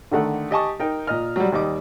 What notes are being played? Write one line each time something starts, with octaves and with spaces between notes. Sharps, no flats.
D3 D#3 A3 F#5
G4 D#5 G#5 A5 C#6
D#4 A#4 G5
A#2 D#5 F6
F#3 G3
D#2 G3 D#5 D6